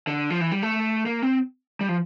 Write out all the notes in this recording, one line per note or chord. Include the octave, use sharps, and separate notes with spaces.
D3
F3
E3
G3
A3
A#3
C4
G3
F3